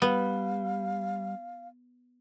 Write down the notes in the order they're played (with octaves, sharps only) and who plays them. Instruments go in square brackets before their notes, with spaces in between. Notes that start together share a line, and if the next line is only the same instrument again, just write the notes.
[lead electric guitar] G3 [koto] B3 [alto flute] F5